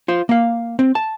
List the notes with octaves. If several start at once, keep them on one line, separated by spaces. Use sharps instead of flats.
F4 C5
A#3 F5
C4
A5